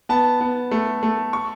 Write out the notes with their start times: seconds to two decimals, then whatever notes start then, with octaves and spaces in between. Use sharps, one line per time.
0.09 B3 A5
0.41 B3
0.71 A3
1.03 A3
1.33 C#6